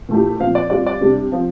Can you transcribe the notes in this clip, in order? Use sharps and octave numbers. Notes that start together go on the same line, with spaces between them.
A#2 A3 E4 G4
A#2 F3 C4 F5
D5
G3 C4 F4 D5
D5
C3 G3 D4 G4
F3 C4 F4